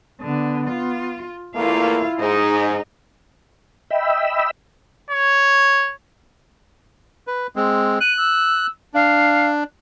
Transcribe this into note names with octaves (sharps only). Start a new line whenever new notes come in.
D3 B3
F4
E2 A3 A#3 E4 F4 F5
G#2 D#4 G#4
D#5 E5 G5 B5 E6
C#5
B4
G#3 C4
F#6 D#7
E6
D4 F5